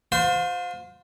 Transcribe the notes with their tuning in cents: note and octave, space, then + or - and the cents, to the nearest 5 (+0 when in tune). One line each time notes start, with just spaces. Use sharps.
F4 +35 C5 -25